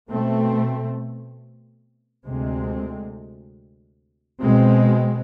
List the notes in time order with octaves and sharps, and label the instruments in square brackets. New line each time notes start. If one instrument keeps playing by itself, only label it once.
[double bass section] B2 A3 C4
D2 C3 G#3 C4
B2 G#3 C4